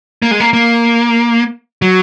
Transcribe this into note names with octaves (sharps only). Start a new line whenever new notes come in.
A#3
G#3
A#3
A#3
F#3